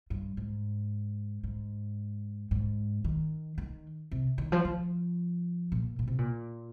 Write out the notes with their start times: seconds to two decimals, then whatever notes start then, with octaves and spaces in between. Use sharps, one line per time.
0.10 G2
0.37 G#2
1.44 G#2
2.51 G#2
3.04 D#3
3.58 D#3
4.11 C3
4.38 D#3
4.52 F3
4.65 F3
5.72 A#2
5.99 A#2
6.08 C3
6.18 A#2